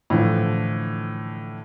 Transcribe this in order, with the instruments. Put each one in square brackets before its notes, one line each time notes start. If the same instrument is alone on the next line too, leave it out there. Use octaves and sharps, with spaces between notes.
[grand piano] A2 D3 E3 F3